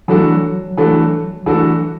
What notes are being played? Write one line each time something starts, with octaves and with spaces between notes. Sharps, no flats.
E3 F#3 A3 D4 F#4 A4
E3 A3 D4 F#4 A4
E3 A3 D4 F#4 A4